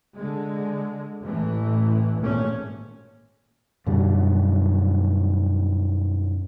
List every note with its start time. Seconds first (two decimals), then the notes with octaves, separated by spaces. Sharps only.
0.16 D3 G#3
1.22 A1 A2 E3
2.19 G#1 A#2 A3 C#4
3.87 F#2 B2 D3 G3